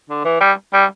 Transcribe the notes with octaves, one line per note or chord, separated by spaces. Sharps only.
D3
E3
G3
G3